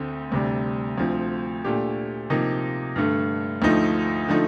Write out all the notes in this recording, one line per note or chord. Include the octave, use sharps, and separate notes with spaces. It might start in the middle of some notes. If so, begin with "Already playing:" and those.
Already playing: D2 D3 A3 C4
D2 C3 G3 D4
D2 D3 F3 C4
A#2 A3 D4 G4
C3 F3 A#3 D#4
G2 D3 A3
D2 D3 F3 A3 D#4
D3 F3 A3 D#4